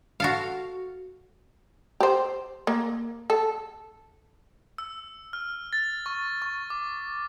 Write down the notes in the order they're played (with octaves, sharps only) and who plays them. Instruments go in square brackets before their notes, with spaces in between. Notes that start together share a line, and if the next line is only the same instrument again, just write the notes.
[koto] F#4 A4 F5
[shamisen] G4 C5
A#3
A4
[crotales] E6
F6
A6
C#6
C#6
D6